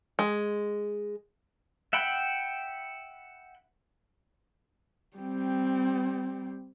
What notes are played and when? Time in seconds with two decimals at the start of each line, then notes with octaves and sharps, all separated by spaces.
0.19 G#3
1.93 E5 F#5 G5 B5
5.17 G3 C4